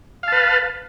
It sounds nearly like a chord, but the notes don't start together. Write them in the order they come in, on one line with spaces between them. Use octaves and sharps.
F5 A5 B4